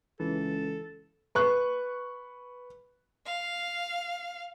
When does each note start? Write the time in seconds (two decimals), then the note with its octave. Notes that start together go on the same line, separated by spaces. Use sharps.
0.20 C#2 E3 A4
1.35 B4 C#6 F#6
3.26 F5